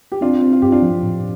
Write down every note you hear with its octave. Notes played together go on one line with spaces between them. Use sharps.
G4
C4 D4 F4
C4
F4
G2 G4
D4 F4
F3
A2